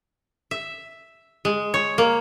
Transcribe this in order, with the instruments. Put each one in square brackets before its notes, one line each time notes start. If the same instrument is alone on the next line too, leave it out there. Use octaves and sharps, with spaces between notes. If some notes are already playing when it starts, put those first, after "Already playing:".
[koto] E5
G#3
C#5
A#3